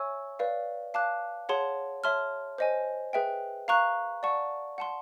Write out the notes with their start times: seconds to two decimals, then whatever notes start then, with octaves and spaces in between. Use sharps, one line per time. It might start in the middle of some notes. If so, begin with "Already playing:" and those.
Already playing: C#5 E5 G#5 C#6 E6
0.39 B4 D5 F5
0.94 F5 A5 D6 F#6
1.49 G#4 C#5 F#5 A5 C6
2.04 C#5 E5 A5 C6 F6
2.58 C5 D#5 G#5
3.13 G#4 B4 E5 G5
3.68 F5 A#5 C#6 F#6
4.23 D5 F#5 A5 C#6
4.78 F#5 A5 C6